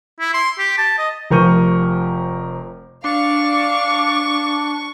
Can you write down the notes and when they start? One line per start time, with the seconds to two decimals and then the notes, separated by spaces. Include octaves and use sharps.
0.20 E4
0.34 C6
0.58 G4
0.78 A5
0.98 D#5
1.30 F1 F3 A#4 C#6 G6 D#7
3.04 D4 F5 C#6 D6